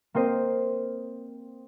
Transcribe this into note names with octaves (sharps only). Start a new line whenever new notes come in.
A#3 C4 C5 D#5